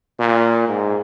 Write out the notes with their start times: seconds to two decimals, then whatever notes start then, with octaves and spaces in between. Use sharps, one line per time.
0.19 A#2
0.68 G#2